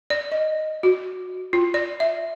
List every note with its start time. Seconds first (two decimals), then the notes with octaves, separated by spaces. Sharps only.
0.10 D5
0.32 D#5
0.83 F#4
1.53 F4
1.74 D5
2.00 E5